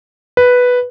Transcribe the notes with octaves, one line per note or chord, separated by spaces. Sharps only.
B4